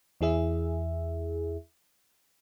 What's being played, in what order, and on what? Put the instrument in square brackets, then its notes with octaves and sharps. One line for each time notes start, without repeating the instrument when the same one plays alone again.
[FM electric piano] E2 E4 G#4 E5